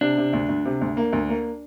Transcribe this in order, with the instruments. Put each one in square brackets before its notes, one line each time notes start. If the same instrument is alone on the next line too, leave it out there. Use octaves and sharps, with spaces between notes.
[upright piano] C3 [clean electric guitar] D4
[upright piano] C3
D2
D2
C3
D2
A#3
D2
A#3